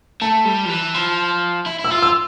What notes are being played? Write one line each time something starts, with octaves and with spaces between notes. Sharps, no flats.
A3 A5
G3
F3
E3
F3
E4
E4
E6
F4
E6